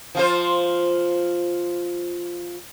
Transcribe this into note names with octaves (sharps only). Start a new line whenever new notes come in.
F3 F4 C5